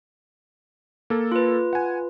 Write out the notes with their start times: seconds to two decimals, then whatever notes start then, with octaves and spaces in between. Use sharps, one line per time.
1.10 A#3 A4
1.32 F4 B4
1.73 F#5 G#5